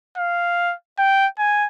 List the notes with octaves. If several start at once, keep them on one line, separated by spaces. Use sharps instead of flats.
F5
G5
G#5